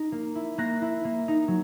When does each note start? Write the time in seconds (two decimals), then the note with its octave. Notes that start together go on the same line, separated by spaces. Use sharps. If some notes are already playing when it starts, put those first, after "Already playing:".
Already playing: D#4
0.12 A#3
0.35 E4
0.58 A#3 F#6 A#6
0.82 E4
1.05 A#3
1.28 D#4
1.48 F#3